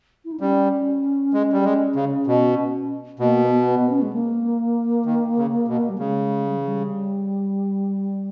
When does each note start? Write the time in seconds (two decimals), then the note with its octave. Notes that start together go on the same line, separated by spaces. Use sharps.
0.25 E4
0.32 D#4
0.40 G3 C#4
1.33 G#3
1.53 G3
1.64 G#3
1.96 C#3
2.27 B2
3.19 B2 A#3
3.43 B3
3.66 B3
3.90 C#4
4.02 G#3
4.13 A#3
5.06 D#3
5.37 C#3
5.68 B2
5.89 G3
5.98 C#3 G#3
6.46 G3
6.57 E3
6.67 G3